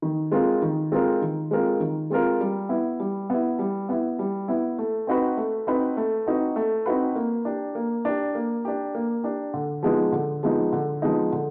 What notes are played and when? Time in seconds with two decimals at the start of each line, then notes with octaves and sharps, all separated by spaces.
0.02 D#3
0.31 G#3 C4 F4 A#4
0.62 D#3
0.92 G#3 C4 F4 A#4
1.22 D#3
1.51 G#3 C4 F4 A#4
1.80 D#3
2.10 G#3 C4 F4 A#4
2.40 G3
2.69 B3 E4
3.00 G3
3.30 B3 E4
3.59 G3
3.89 B3 E4
4.19 G3
4.48 B3 E4
4.78 A3
5.07 C4 D#4 F#4 B4
5.37 A3
5.67 C4 D#4 F#4 B4
5.97 A3
6.27 C4 D#4 F#4 B4
6.56 A3
6.86 C4 D#4 F#4 B4
7.16 A#3
7.45 D4 G4
7.75 A#3
8.05 D4 G4
8.35 A#3
8.65 D4 G4
8.95 A#3
9.24 D4 G4
9.54 D3
9.83 F3 G#3 B3 D#4
10.12 D3
10.43 F3 G#3 B3 D#4
10.72 D3
11.02 F3 G#3 B3 D#4
11.32 D3